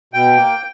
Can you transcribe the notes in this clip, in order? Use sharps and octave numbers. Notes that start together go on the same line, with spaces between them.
B2 G5
A#3